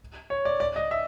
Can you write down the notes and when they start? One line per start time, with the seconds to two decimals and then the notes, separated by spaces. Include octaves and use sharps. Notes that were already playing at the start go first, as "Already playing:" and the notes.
0.30 C#5
0.45 D5
0.60 D5
0.76 D#5
0.91 E5